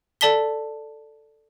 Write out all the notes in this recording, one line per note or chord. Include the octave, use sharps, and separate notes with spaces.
A4 D5 A5 B6 G7